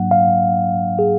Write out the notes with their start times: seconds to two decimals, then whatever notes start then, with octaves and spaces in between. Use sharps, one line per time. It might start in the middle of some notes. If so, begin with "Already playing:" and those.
Already playing: G#2 F#3 A#3 D4 F#5
0.11 F5
0.99 G#4